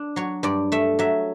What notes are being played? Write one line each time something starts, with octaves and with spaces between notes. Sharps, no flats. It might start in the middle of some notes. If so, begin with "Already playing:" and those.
Already playing: D4
F#3 C#5
G2 D5
A3 E5
F#3 E5